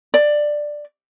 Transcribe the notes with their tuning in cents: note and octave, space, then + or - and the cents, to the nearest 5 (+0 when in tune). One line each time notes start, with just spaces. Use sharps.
D5 +10